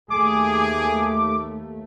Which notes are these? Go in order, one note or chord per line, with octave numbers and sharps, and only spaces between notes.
D#2 A3 G#4 D6